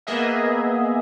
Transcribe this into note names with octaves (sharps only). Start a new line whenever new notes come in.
A#3 B3 G#4 D#5 E5